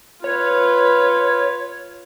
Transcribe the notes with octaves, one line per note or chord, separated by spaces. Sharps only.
F4 B4 C#5